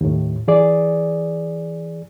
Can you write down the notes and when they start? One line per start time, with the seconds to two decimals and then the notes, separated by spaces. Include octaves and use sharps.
0.01 D#2 A2
0.48 E3 G#4 D5